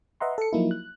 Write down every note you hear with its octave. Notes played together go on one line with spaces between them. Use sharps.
B4 D#5 E5 F#5 A#5 C6
A4 C#7
F3 F#3 A#3 D#4 E4
F#6